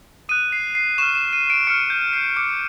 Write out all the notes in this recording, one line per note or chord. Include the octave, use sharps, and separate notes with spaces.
D#6 F#6 D#7
C7
C7
C#6 F6 E7
E7
D#7
D7
C#6 F6 C#7
G6
C7
D6 F6 C#7